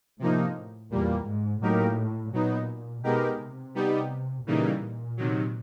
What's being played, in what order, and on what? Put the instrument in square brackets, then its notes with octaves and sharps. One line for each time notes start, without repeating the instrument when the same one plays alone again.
[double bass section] A2 [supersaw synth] C3 F3 A#3 D#4
[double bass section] E2 [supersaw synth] A#2 G3 A#3
[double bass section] G#2
[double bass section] A2 [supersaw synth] F#3 A#3 D#4 G4 A#4
[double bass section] A#2 [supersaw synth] F#3 B3 D#4
[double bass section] B2 [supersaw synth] G#3 B3 D#4 G4 A#4
[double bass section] C3
[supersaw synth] G3 B3 D#4 G4
[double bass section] A#2 [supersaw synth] C#3 E3 G3 A#3 D#4
[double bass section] A#2
[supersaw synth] C3 D#3 F#3